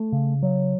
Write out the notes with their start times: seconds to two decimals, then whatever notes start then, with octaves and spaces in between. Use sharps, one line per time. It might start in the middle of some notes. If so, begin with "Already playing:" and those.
Already playing: A3
0.12 C#3
0.43 F#3